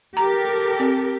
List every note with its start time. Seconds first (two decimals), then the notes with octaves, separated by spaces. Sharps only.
0.17 G4 A4 A#4 A#5
0.80 C4